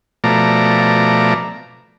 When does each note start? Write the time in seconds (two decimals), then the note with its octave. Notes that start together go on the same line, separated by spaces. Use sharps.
0.24 B2 F3 A3 D5 A#5